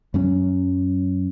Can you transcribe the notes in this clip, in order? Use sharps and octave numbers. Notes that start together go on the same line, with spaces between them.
F#2 F#3 C#4